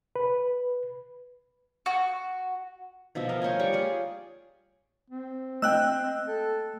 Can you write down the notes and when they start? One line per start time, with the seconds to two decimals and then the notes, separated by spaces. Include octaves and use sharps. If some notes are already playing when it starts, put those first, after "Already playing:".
0.16 B4
1.86 F#4
3.15 B2 F3 D#5 E5
3.29 A#4 D#5 F5
3.42 C5 C#5 D#5 G#5
3.59 G3 C#6
3.73 F4 G#4 G5 G#5
5.10 C4
5.62 A3 D#5 G5 E6 F#6
6.27 A4